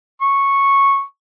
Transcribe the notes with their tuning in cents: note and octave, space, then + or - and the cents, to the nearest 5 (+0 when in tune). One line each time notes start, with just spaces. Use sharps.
C#6 -10